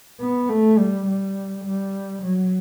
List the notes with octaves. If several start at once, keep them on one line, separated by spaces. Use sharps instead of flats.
B3
A3
G3
G3
G3
F#3